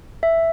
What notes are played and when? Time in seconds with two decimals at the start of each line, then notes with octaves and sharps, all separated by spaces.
0.23 E5